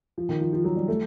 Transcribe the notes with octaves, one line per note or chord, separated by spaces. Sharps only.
F3
D#3
F3
F3
F#3
G3
A3